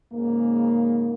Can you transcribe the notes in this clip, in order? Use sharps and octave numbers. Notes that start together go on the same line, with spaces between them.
G#2 C#3 A#3